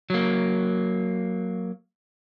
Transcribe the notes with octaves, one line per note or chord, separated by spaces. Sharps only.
F#3 A#3